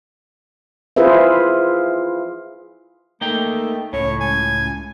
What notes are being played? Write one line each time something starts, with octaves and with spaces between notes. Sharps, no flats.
E4 F4 G#4 B4 C5 E5
A3 A#3 D#4 G5
C#2 A2 C#5
G#5